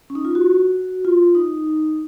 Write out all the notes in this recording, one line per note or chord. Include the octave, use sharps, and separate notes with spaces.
C#4
D#4
F4
F#4
F4
D#4